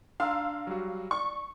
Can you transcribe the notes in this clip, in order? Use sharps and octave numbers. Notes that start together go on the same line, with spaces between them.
D4 F5 A#5 C6 E6
F#3 G3 F#4
D5 C#6